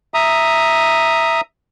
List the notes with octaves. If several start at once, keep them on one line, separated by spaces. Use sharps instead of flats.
E5 A#5 D#6